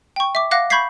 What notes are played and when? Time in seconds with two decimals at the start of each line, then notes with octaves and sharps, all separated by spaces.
0.16 G5 C#6
0.35 E5 D6
0.51 F5 F#5 D6 F#6 A#6
0.70 B5 C#6 G6 G#6 B6 C7